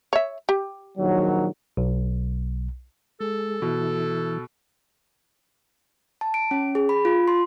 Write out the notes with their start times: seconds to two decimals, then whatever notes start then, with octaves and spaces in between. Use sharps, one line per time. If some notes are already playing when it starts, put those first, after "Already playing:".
0.13 C#5 E5
0.49 G4
0.98 A#1 D#3 F#3
1.77 B1
3.20 G#3 A4
3.62 B2 E3
6.21 A5
6.34 D7
6.51 C#4
6.75 G#4
6.89 B5
7.05 F4
7.28 C6